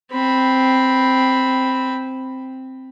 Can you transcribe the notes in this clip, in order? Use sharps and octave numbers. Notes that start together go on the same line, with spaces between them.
C4 B5